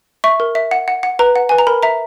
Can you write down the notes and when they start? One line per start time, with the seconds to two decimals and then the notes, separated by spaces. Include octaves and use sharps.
0.24 E5 C#6
0.40 A#4
0.55 E5
0.71 F#5
0.88 F#5
1.03 F#5
1.19 B4 A#5
1.36 F#5
1.49 B4 G#5
1.58 A#5
1.67 A#4 B5
1.83 E5 A#5